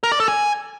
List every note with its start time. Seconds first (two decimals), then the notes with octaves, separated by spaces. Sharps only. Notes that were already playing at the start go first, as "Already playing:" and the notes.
0.04 A#4
0.12 D5
0.20 A4
0.28 G#5